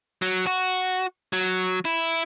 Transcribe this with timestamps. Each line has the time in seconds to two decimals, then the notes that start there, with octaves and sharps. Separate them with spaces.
0.22 F#3
0.46 F#4
1.33 F#3
1.85 E4